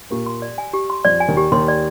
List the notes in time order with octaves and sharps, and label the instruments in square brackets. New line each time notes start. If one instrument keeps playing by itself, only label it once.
[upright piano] A#2 A#3 [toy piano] G4
[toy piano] C6
D5
G#5
G4
C6
[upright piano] F2 F3 [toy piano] D5
[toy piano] G#5
[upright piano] D#2 D#3
[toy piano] G4
[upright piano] D#2 D#3 [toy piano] C6
[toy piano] D5